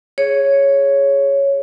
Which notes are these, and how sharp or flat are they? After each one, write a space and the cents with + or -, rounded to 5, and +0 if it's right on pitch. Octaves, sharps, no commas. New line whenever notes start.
G#4 +0 C#5 +0